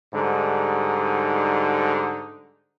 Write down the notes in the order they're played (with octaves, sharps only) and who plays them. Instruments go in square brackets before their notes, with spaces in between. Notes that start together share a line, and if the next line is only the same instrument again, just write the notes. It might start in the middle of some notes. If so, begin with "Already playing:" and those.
[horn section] G#2 D3 G3 D#4